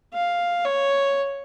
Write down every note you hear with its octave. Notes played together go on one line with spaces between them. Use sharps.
F5
C#5